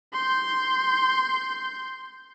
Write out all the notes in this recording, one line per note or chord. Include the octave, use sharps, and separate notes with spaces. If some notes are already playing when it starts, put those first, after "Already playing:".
C6 G6